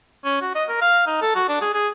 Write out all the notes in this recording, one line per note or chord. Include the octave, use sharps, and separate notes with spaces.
C#4
F#4
D#5
A#4
F5
D#4
A4
F#4
D4
G#4
G#4